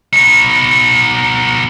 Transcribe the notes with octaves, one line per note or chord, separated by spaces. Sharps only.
B2 D#4